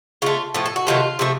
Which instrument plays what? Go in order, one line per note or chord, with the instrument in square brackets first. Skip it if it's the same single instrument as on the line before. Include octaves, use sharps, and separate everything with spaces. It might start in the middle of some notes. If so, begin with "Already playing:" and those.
[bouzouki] C#3 A3 F4
A2 F3 A3
A4
F#4
C3 D#3 F#3 A3 F4
C3 F3 A3